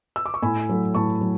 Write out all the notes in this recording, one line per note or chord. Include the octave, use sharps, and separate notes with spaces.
E6
D6
C#6
A2 G#5 B5
F#3 A3
A2 A5 C#6
F#3